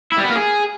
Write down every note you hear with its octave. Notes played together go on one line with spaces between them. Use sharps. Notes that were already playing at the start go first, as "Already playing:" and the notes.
E4
G3
B3
A#3
G#4